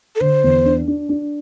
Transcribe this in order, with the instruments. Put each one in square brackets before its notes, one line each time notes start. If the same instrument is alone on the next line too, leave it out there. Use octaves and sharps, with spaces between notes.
[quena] A4
[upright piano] D3 [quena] C5
[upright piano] E2
D4
D4
D4